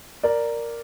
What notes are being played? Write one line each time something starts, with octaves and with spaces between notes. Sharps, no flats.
A#4 D5